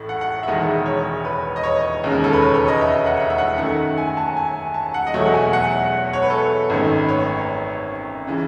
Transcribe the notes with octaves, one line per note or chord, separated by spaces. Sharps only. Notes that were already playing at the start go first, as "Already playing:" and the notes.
Already playing: A1 A2
F#5
F#5
E5
E1 E2 D#3 G#3 D#5
C#5
B4
D#5
C#5
E1 D#2 C#3
A4
B4
C#5
C#5
D#5
E5
F#5
E5
E5
F#5
F#2 D#3 A3 F#5
G#5
A5
G#5
A5
F#5
D#5
E2 B2 F#3 A3 E5
F#5
G#5
F#5
C#5
B4
A4
G#1 F#2 D#3 A3
B4
C#5
C#3 E3